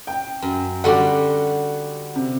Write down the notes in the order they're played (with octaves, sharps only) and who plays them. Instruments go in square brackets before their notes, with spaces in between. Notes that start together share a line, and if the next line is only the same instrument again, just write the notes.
[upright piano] G5
[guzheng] F#2
[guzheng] D3 G3 F#4 [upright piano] F#5 D6
[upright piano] C3